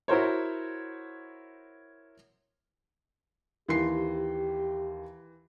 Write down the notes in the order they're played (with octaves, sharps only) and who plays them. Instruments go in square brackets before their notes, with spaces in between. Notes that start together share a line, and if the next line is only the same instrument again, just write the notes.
[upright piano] E4 F#4 A#4 C5 C#5
[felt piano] D#2 C6 C7 [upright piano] E3 [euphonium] G4